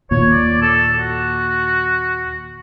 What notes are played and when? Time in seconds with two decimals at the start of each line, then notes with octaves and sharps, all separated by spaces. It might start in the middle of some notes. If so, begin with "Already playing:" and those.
0.11 D#2 A#2 C#5
0.31 D5
0.62 A4
0.97 F#4